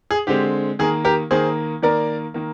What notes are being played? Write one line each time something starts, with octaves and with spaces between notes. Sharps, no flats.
G#4
D3 G#3 C4 G4
D#3 A#3 G#4
G4 A#4
D#3 A#3 G#4 C5
D#3 A#3 A#4 D5
D#3 A#3